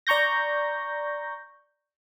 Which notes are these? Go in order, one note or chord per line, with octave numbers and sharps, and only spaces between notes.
D5 A#5 C#6 G6 A#6